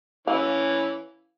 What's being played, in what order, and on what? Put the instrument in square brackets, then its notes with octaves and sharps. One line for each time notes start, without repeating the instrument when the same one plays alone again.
[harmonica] E3 C#4 E4 [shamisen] F5